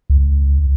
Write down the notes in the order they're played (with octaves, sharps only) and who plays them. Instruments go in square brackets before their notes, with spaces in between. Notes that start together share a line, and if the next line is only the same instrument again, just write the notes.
[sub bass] C#2